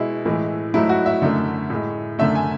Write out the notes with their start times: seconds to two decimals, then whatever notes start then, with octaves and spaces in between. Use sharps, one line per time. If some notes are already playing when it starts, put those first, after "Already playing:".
Already playing: B2 G#3 E4
0.25 A2 E3 G#3
0.74 G#2 F#3 A3 E4
0.89 F#4
1.06 E5
1.22 F#2 D3 A3
1.70 A2 G#3
2.19 F#2 D3 A3 E5
2.35 G#5